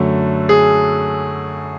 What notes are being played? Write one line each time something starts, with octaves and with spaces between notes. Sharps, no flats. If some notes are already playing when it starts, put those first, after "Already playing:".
Already playing: F#2 D3 F#3 A3
G#4